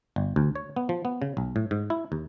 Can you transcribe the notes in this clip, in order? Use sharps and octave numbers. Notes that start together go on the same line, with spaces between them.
G1
D2
C#5
B3
F3
B3
C#3
B1
A2
G#2
E4
D#2